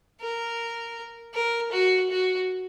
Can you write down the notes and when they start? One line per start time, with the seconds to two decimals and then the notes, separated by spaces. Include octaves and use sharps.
0.21 A#4
1.34 A#4
1.72 F#4
2.11 F#4